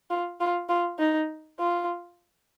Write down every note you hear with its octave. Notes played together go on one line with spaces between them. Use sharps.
F4
F4
F4
D#4
F4